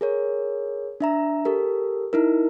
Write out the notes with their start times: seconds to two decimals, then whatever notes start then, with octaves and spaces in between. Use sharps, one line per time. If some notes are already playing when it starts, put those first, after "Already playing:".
0.01 G#4 A#4 C#5
1.01 D4 E5 A#5
1.45 G4 A4 A#4
2.13 D#4 E4 A#4